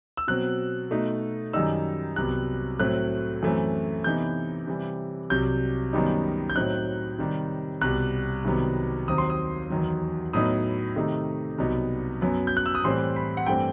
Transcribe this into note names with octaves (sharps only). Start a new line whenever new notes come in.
E6
B2 F#3 C4 F#6
B2 A3 D#4
F#2 D#3 G3 D#4 E6
C2 C3 F#3 B3 F#6
A2 F#3 A3 C4 F#6
F#2 E3 A3 C4
C3 E3 B3 D#4 G6
C3 E3 G3
C2 C3 F#3 G6
F#2 D#3 G3 B3 D#4
G6
A2 F#3 C4 D#4 F#6
C3 D#3 G3
C2 B2 G3 F#6
C2 C3 D#3 F#3 B3
D#2 D#3 F#3 C4 D#6
C6
D#6
E2 D#3 F#3
A2 F#3 B3 D#4 D#6
C3 D#3 A3 D#4
C2 B2 F#3 B3 D#4
F#2 F#3 B3
G6
F#6
E6
D#6
A2 E3 G3 C4 C6
B5
F#5
G2 E3 A3 C4 G5